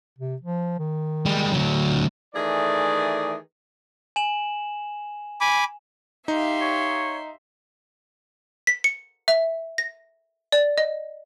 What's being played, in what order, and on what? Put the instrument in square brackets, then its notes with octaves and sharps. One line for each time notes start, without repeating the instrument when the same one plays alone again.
[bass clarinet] C3
F3
D#3
[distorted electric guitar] G3 G#3
D2 F#3
[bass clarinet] A#2
[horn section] D#3 E3 A3 G#4 D5
[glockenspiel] G#5 E7 F#7
[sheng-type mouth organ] G#5 B5 D6
[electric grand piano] D#4 [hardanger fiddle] G4 F5 [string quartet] E5 C6
[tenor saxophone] C#5
[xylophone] B6
C#7
E5
A#6
D5
D#5